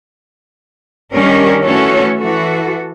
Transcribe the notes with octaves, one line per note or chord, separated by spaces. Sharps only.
D#3 G3 C#4 D4 G4 A#4
E3 A3 C#4 F#4 A4 C#5
E3 F#4 A4